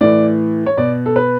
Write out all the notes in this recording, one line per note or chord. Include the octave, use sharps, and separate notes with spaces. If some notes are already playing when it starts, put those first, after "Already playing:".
A2 E3 D5
C#5
B2 D5
A4
B4